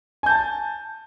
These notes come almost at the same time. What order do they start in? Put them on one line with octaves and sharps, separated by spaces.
G#5 G6 A5